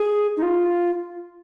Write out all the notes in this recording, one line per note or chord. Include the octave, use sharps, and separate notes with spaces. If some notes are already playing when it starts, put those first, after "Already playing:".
Already playing: G#4
D#4
F4